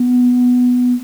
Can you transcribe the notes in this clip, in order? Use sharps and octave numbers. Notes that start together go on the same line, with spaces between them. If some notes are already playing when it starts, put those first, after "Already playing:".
Already playing: B3